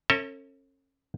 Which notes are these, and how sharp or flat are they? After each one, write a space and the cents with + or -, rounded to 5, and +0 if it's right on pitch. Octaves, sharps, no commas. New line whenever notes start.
C#4 -30 A4 +40 E5 -45